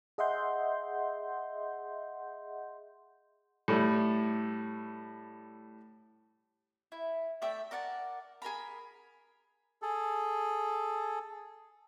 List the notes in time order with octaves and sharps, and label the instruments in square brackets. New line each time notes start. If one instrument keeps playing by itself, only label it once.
[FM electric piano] G#4 D#5 E5 F#5 C6 G6
[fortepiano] A2 G3 A3
[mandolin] E4
A3 D5 E5 G5
A#4 D5 F#5 A5
G#4 A#4 A#5 B5
[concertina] G#4 A4